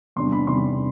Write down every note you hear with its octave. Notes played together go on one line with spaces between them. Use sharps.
E2 C3 G3 D4 C6
B5
E2 C3 G3 D4 C6